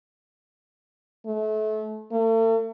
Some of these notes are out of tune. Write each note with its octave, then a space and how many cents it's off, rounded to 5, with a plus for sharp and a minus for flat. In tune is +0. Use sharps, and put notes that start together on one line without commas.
A3 -30
A3 +40